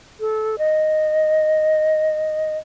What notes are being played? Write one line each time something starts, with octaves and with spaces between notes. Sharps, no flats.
A4
D#5